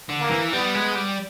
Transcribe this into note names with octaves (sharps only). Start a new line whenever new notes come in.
D3
A#3
E3
G3 B3
G#3
G3